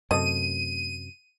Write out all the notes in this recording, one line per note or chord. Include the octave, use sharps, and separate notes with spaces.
F#2 C3 A3 D#5 D#7